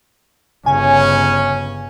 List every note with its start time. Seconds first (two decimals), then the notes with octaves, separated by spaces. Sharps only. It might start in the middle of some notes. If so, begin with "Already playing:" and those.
0.66 G1 C#3 C#4 G#5